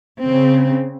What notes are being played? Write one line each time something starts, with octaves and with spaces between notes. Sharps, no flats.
C#3 C4